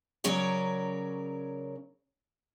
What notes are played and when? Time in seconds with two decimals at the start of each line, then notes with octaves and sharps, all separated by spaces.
0.24 C#3 F#3 C#4 A#4 C#5 D5